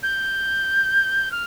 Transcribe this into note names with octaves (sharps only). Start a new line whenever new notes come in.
G6
F6